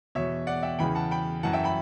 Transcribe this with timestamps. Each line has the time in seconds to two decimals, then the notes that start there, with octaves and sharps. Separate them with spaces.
0.15 E2 B2 C#5 E5
0.47 D5 F#5
0.63 E5 G5
0.79 E2 C#3 E3 G5 B5
0.95 F#5 A5
1.11 G5 B5
1.43 F#2 E3 F#5 A5
1.53 E5 G5
1.64 G5 B5